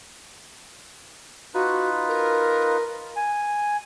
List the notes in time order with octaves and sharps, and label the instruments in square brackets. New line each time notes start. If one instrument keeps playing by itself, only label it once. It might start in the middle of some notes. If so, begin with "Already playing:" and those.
[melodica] D#4 F4 B4 [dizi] F#4
[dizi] A#4
[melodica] G#5